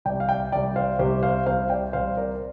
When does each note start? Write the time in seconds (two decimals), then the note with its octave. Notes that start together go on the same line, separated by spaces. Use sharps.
0.05 C2 C3 D5 G5
0.20 F5
0.29 D5 G5
0.52 C2 C3 D5 G5
0.76 C5 F5
0.99 C2 C3 G4 C5
1.23 C5 F5
1.46 C2 C3 C5 F5
1.70 D5 G5
1.93 C2 C3 C5 F5
2.17 A#4 D5
2.35 A#4